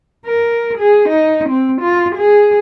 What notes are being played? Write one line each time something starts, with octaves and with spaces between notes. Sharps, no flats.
A#4
G#4
D#4
C4
F4
G#4